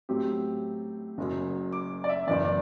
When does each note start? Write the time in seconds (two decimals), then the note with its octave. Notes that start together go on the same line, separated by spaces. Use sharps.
0.09 A2 F#3 C4 G4
1.18 F#1 F#2 F#3
1.72 D6
2.04 D5
2.09 E5
2.27 F#1 F#2 E3 D5
2.45 D5